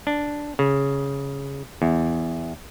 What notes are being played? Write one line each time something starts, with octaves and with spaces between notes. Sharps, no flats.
D4
C#3
E2